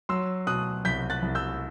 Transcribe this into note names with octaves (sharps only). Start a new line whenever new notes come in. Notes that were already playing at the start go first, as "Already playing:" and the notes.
F#3 C6 E6
B2 D#6 F#6
C2 G6 B6
F#6 A6
C2
E6 G6